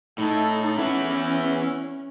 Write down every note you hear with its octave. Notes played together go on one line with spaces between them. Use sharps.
A2 D#4 A4
E3 B3 C#4 E4